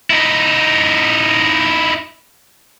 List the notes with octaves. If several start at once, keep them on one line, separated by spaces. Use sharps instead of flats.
D#4 E4